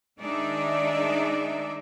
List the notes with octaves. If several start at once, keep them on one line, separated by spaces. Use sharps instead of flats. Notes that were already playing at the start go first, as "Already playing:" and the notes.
D#3 G#3 D4 D#4 D5 E5